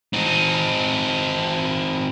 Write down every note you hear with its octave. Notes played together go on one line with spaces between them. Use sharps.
C4 D#4